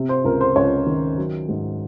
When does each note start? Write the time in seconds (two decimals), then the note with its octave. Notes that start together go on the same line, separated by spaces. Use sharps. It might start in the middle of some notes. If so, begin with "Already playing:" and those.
Already playing: C3
0.09 C5
0.24 C#2 A#4
0.41 C5
0.56 C#2 C#5
0.86 D#3
1.17 F#3
1.49 G#2